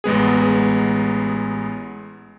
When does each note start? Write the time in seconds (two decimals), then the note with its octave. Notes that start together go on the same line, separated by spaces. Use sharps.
0.04 A1 G#3 B3 G#4